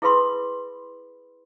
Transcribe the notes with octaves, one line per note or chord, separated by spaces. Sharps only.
E4 G#4 A4 B4 B5 C6